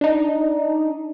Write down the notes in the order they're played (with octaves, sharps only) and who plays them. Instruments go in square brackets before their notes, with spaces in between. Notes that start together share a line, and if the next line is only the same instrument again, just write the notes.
[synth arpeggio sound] D4 D#4